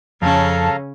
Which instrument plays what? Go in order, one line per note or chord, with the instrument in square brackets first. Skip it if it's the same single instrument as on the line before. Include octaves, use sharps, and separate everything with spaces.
[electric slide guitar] F2 [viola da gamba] C#3 C#4 [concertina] A4 F5 A#5 [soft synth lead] A5